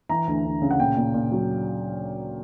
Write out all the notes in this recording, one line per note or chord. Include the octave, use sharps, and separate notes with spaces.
E3 A#5
D2
D2
C#3
F#5
A#2 G5
A#2
A#2
F#3